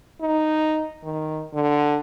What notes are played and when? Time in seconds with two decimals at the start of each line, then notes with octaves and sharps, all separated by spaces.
0.21 D#4
1.04 D#3
1.53 D3